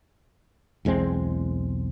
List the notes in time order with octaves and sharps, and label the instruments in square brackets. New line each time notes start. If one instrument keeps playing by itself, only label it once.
[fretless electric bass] B1 E2 G#3 C4